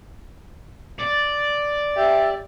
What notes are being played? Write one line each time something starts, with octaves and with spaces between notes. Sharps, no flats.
D5
G4 E5